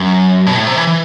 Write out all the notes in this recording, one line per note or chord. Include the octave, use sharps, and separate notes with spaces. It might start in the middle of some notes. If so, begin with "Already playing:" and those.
Already playing: F#2
B2
A2
C3
E3
E3